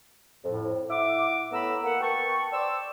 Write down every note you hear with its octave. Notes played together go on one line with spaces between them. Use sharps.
F2 A2
E4 E5 F#5 D6
A2 B3 A#5 B5 E6
A#3 F#5
B4 G5 A5 C#6
D5 G5 C6 D6 E6